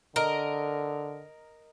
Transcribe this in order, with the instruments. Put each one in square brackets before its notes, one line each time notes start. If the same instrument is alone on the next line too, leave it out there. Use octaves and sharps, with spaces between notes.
[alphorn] D3 [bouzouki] A#4 D#5